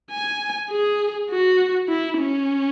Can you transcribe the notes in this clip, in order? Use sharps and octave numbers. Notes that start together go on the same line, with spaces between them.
G#5
G#4
F#4
E4
C#4